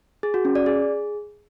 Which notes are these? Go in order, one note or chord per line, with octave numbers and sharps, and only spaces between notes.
G#4
F#4
C#4
D5
G#4